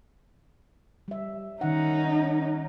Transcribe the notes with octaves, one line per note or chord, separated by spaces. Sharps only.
G3 E5
D#3 C#4 D#4 F#5